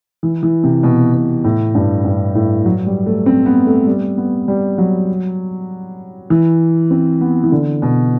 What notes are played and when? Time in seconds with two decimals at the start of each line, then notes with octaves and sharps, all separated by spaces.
0.23 E3
0.43 E3
0.64 C3
0.83 B2
1.14 B2
1.44 A2
1.75 G2
2.05 G2
2.35 A2
2.66 F#3
2.86 G3
3.06 A3
3.26 C4
3.46 B3
3.67 A3
3.86 G3
4.18 B3
4.48 G3
4.78 F#3
6.30 E3
6.91 C4
7.21 B3
7.44 E3
7.52 D3
7.82 B2